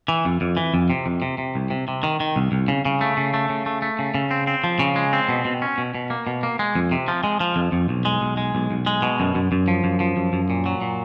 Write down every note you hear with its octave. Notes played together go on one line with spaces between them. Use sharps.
E3
F2
F2
E3
F2
C3
F2
C3
C3
C2
C3
C3
D#3
D#3
C2
C2
C#3
C#3
A3
C#3
A3
C#3
A3
A3
C#3
C#3
C4
C4
F3
C#3
G#3
C4
B2
B2
C#4
B2
B2
A#3
B2
A#3
G#3
F2
C3
F3
G#3
F3
F2
F2
B1
G#3
B1
G#3
B1
B1
G#3
B2
F#2
F#2
F#2
F3
F#2
F3
F#2
F#2
A#2
F#3
A#2